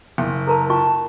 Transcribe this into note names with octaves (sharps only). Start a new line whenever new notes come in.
F#1
A4 A#4 A5 A#5
F4 G5 A5 C#6